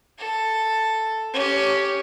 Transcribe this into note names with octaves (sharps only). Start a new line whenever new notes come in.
A4
C#4 G4